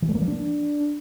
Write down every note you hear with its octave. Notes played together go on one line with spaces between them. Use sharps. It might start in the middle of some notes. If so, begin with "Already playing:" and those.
E3
A3
A#3
F3
D4